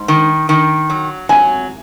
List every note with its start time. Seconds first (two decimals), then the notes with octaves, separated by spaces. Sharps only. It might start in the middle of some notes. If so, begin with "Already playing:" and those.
Already playing: G#2
0.08 D#3
0.49 D#3
0.90 F#3
1.29 F#3 G#5